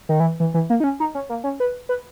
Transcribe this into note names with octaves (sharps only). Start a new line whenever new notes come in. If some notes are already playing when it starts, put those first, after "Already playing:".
D#3
E3
E3
E3
A#3
D#4
C#4
D#4
C#4
A#3
C#4
B4
B4